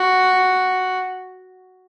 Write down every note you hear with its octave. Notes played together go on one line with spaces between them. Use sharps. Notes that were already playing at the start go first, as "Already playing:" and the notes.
Already playing: F#4